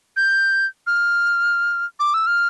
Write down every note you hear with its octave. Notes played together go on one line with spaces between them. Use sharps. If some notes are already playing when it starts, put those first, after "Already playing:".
G6
F6
D6
E6
F6